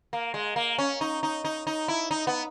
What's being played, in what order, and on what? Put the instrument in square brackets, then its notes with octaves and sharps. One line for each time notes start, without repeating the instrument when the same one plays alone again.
[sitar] A#3
G#3
A#3
C#4
D#4
D#4
D#4
D#4
E4
D#4
B3